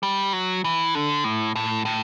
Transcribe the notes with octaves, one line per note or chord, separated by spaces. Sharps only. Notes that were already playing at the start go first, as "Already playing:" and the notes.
G3
F#3
E3
D3
A2
A2
A2